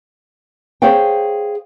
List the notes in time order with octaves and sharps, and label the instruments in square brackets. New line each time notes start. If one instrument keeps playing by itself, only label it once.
[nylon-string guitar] G#4 C5 C#5 F5 G5